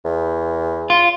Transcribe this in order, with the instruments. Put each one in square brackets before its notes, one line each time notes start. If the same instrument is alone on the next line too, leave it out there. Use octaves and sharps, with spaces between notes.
[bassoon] E2
[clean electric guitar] F4